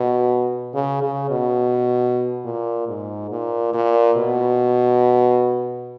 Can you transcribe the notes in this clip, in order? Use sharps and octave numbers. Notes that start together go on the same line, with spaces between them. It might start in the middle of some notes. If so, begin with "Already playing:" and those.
Already playing: B2
C#3
C#3
B2
A#2
G#2
A#2
A#2
B2